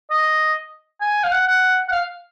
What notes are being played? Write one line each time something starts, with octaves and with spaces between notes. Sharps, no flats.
D#5
G#5
F5
F#5
F#5
F#5
F5